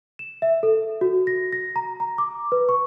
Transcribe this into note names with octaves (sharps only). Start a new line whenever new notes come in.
E7
E5
A4
F#4
A#6
A#6
A#5
A#5
D6
B4
C#6